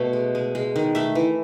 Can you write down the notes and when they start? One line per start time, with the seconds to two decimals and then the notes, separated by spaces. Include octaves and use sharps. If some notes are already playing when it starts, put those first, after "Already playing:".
Already playing: B2 A3 E5
0.13 G#3
0.35 G#3
0.55 G#3
0.76 D#3
0.95 A3 E5
1.15 E3